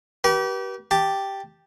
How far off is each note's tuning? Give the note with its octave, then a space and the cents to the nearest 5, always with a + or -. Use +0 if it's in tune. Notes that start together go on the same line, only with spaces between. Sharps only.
G4 -30 B4 -40
G4 +0 A5 +0